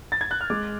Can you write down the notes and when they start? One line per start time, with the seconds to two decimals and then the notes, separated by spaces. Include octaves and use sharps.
0.12 A6
0.21 G#6
0.31 F#6
0.41 F6
0.50 G#3 D6